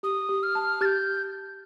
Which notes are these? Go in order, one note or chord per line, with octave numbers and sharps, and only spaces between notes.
G4 D#6
G4
F6
A5
G4 G6 A6